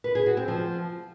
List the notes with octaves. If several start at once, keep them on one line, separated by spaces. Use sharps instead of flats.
B4
G#4
F#4
C4
F3